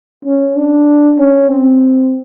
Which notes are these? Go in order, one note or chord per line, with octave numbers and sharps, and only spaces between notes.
C#4
D4
C#4
C4